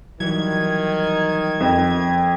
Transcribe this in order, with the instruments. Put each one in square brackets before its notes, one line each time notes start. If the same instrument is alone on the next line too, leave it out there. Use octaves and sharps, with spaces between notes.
[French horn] D#3 [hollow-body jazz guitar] E3 F#3 G3 [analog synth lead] G#6
[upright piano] F2 [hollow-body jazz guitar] A#4 D#5 E5